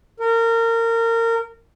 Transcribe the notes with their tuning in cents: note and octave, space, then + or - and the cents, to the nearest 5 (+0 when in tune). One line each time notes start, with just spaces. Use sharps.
A#4 -25